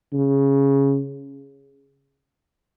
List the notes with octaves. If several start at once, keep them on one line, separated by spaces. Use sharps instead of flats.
C#3